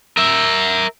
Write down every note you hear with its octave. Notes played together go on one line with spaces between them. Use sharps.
A#4 E5